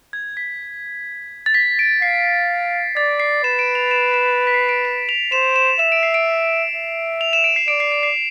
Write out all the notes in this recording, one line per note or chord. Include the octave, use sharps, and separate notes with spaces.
G#6
B6
A6
B6
D7
F5 C7
D5 A6
C7
B4 E7
D7
F7
E7
E7
B6
C7
D7
E7
F7
C5 E7
E7
E5 E7
D7
C7
D7
E5
F7
E7
D7
C7
D5 D7
C7
D7
C7